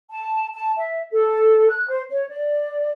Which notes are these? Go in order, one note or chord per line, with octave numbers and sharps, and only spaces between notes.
A5
A5
E5
A4
F#6
C5
C#5
D5